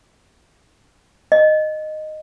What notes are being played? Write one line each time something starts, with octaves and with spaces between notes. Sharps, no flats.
D#5